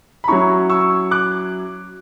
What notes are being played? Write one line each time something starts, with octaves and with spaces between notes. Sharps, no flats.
B5
F#3 C#4 E4 A#5 C#6
C#6 E6
D6 F#6